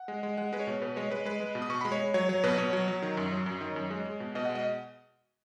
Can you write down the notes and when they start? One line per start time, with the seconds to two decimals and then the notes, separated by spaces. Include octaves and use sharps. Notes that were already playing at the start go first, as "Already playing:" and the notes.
Already playing: F#5
0.08 G#3
0.23 G#3
0.37 G#3 F#5
0.53 G#3 B4
0.60 C#5
0.67 B2
0.82 B2 B4
0.96 G#3 C#5
1.11 G#3 B4
1.25 G#3 B4
1.40 G#3
1.55 B2
1.62 D#6
1.70 B2 C#6
1.81 G#3 B5
1.92 C#5
1.99 G#3
2.14 F#3 C#5
2.29 F#3 C#5
2.44 B2 B4
2.58 B2 C#5
2.73 F#3
2.88 F#3
3.02 D#3
3.17 F#2
3.32 F#3
3.46 F#2
3.61 D#3
3.76 F#2
3.90 G#3
4.06 G#3
4.20 B2
4.35 B2 D#5
4.45 G#3 F#5
4.55 D#5